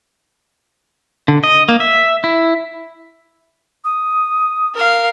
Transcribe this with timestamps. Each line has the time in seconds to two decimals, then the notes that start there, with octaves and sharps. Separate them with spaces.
1.28 D3
1.44 D#5
1.69 A#3
1.80 E5
2.24 E4
3.85 D#6
4.74 A#4 F5